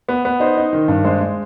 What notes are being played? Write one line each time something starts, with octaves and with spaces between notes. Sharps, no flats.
B3
B3
D#4 C5
D#4
D#3
G2
G#3 C5
G#3